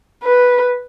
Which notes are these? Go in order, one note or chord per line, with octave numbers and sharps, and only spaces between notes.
B4